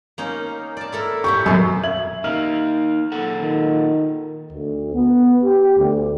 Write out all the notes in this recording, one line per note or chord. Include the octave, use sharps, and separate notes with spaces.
A#3 C#4 D#4
D5 A5
E4 A4 A#4
A2 E4 G4 C#6
F#2 B2 D#3
E5 G#6 F#7
D#3 A#3 D#4 F6 F#7
A#2 A4 F#5
D#3
D2
B3
G4
D2